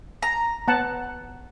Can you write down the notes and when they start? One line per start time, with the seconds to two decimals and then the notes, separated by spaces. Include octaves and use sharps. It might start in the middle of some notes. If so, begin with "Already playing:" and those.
0.22 A#5
0.68 B3 F#5 A5